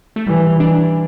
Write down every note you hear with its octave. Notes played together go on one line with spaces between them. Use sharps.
A3
E3 G3
E3 D4